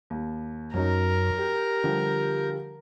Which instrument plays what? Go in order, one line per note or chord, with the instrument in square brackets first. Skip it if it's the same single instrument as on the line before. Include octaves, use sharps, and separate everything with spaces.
[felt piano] D#2
[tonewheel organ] F#2 [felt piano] F#3 C#4 D#4 [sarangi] A#4
[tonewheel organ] G4
[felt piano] D3 F3 G3